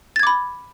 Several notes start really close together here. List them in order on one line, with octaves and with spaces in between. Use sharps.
A6 G#6 D6 B5